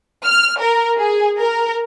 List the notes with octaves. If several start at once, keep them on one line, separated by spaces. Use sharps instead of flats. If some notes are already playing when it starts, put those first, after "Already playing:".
F6
A#4
G#4
A#4